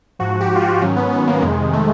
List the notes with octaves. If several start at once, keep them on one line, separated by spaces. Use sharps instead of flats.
G#2 F3 F#4
G4
F4
F#4
G#2 D#3 F#3 C#4
B3
B3
A#3
F2 C3 D#3 G#3
A3